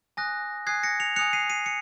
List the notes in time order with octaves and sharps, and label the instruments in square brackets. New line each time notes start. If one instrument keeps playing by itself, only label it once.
[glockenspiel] G#5 D#6 F#6 A#6
G#5 D#6 F#6 G#6 C7
A#6 C#7
C#7 F7
F#6 C#7 F7
G#5 D#6
C7 D#7
C7 D#7
C#7